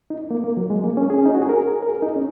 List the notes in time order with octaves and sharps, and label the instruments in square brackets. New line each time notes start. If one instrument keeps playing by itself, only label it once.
[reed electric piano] D#4
A#3
A#3
F#3
G#3
A#3
C#4
G#4
C#4
D#4
F#4
G#4
A#4
A#4
G#4
D#4
C#4